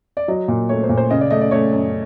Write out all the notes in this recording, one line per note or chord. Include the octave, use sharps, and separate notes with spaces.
D5
F#3 D#5
A#2
A3 C#5
C5
A#2
C5
C#3 D#5
D5
A3 D#5
D5
A3 C#5
F#2